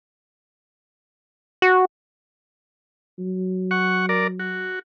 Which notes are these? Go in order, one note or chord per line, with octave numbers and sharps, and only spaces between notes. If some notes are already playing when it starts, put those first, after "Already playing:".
F#4
F#3
F#5 C#6
A#4 D5
F#4